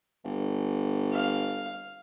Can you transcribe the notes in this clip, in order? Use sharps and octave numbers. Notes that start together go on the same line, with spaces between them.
G1
F5